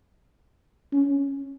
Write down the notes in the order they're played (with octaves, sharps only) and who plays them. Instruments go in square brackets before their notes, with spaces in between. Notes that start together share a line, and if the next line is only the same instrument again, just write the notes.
[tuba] C#4